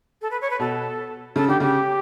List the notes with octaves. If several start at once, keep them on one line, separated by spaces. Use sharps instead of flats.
A4
B4
C#5
B4
B2 A4
C#3 A4
D3 G4
C#3 G4